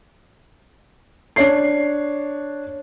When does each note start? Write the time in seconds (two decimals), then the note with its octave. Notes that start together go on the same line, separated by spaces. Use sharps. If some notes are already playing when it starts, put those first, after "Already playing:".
1.36 D4 C#5 C7